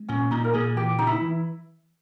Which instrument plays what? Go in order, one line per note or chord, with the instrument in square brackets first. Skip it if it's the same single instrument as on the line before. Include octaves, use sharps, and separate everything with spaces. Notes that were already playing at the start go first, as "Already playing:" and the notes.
Already playing: [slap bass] G#3
[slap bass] A#2 [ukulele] C#4
[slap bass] A#2 [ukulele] D#4
[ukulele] A#4
[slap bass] A#2 [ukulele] G#4
[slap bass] E3 [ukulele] G4
[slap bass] C#3 [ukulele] D#4
[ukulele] E4
[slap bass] E3